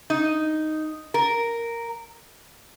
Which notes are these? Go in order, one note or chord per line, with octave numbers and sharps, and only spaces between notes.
D#4
A#4